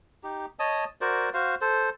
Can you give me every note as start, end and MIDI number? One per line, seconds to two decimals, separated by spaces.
0.23 0.46 63
0.23 0.46 67
0.59 0.85 73
0.59 0.85 75
0.59 0.85 81
0.59 0.85 87
1.01 1.30 66
1.01 1.30 70
1.01 1.30 72
1.01 1.30 74
1.34 1.55 66
1.34 1.55 72
1.34 1.55 77
1.61 1.90 69
1.61 1.90 72